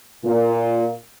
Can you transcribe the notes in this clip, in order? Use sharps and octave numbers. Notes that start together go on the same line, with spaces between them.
A#2